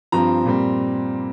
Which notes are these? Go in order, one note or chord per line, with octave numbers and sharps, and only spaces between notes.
G2 F3 C4 A#5
A#2 G3 C4